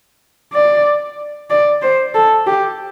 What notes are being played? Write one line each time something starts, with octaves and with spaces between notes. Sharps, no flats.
D5
D5
C5
A4
G4